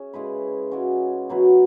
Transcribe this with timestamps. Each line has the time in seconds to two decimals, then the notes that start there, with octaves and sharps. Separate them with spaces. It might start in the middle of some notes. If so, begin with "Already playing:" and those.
Already playing: C#4 G#4 E5
0.13 C#3 G#3 E4 B4
0.71 C#3 G#3 C#4 F#4
1.29 B2 F#3 E4 B4